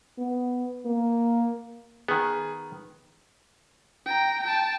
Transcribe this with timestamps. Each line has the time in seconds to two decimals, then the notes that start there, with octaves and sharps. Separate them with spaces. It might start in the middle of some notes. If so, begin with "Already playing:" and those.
0.18 B3
0.85 A#3
2.08 D#3 B3 G#4
4.06 G5 A#5
4.43 G5 A5